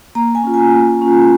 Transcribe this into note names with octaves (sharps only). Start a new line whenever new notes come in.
A#3 A#5
G#5
C#4 F4
G#5
A#3
C#4 F4